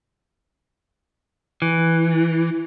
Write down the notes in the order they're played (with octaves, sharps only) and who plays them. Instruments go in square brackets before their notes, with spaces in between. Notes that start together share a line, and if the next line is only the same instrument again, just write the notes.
[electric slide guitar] E3